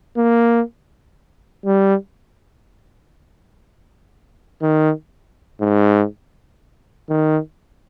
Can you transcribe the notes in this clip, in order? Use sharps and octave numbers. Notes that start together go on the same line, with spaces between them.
A#3
G3
D#3
G#2
D#3